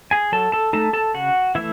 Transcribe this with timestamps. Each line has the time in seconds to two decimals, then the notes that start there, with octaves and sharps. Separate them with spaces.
0.11 G#4 G#5
0.32 F#3 A4 A5
0.52 A4 A5
0.73 A3 D#4 A4 A5
0.93 A4 A5
1.14 C#3 F#4 F#5
1.55 E3 A3 E4 E5